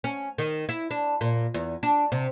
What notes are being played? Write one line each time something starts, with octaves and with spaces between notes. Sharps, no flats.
C#4
D#3
E4
D4
A#2
E2
D4
C3